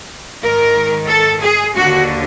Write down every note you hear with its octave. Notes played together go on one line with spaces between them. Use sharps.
G#2 D#3 A#4
A4
G#4
D#2 D3 F#4